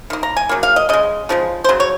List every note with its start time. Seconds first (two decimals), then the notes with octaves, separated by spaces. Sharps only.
0.10 D#3 A#3
0.23 A#5
0.36 G#5
0.49 C#3 F#3 A#3
0.63 F5
0.76 D#5
0.89 C#3 G#3 D#5
1.29 C#3 F3 G#3
1.64 C5
1.69 C#3 F#3
1.80 C#5